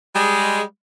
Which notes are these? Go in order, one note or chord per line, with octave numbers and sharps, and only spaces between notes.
G3 G#3